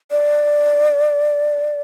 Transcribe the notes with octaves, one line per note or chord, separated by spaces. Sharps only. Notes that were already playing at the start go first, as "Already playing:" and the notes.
D5